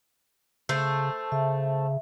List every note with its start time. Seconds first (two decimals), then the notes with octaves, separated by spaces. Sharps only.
0.69 C#3 A3 C5
1.32 C#3 E5